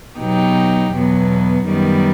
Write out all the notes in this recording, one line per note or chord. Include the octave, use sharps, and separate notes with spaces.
B2 F#3 B3 D#4 G4
E2 B2 F#3 B3
F#2 D#3 G3 B3